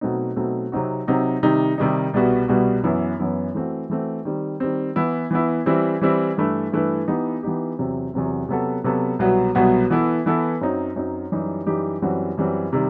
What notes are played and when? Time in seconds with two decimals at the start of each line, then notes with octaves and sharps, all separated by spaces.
0.01 B2 F#3 A3 C4 D#4
0.36 B2 F#3 A3 C4 D#4
0.72 C3 F#3 C4 D#4 F#4
1.07 C3 F#3 C4 D#4 F#4
1.42 C3 D#3 G3 D#4
1.78 C3 D#3 G3 D#4
2.14 C2 B2 G3 B3 F#4
2.48 C2 B2 G3 B3 F#4
2.84 F#2 E3 B3 E4
3.19 F#2 E3 B3 E4
3.54 E3 A3 C4 F#4
3.90 E3 A3 C4 F#4
4.25 D#3 G3 C4
4.60 D#3 G3 C4
4.96 E3 B3 E4
5.31 E3 B3 E4
5.66 E3 G3 C4 E4
6.01 E3 G3 C4 E4
6.37 G2 E3 A3 E4 B4
6.72 G2 E3 A3 E4 B4
7.07 E3 B3 D#4 G4
7.43 E3 B3 D#4 G4
7.79 E2 C3 F#3 C4
8.14 E2 C3 F#3 C4
8.49 C3 F#3 B3 F#4 A4
8.84 C3 F#3 B3 F#4 A4
9.19 C2 B2 F#3 B3 F#4
9.55 C2 B2 F#3 B3 F#4
9.90 E3 B3 E4 A4
10.26 E3 B3 E4 A4
10.61 F#2 F#3 C4 D#4
10.96 F#2 F#3 C4 D#4
11.32 F#2 E3 G3 D#4 G4
11.67 F#2 E3 G3 D#4 G4
12.02 F#2 E3 G3 C4 F#4
12.37 F#2 E3 G3 C4 F#4
12.73 C3 D#3 G3